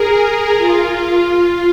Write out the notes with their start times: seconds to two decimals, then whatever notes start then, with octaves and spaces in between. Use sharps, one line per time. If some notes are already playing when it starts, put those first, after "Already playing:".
Already playing: G#4 A#4
0.58 F4
1.37 F4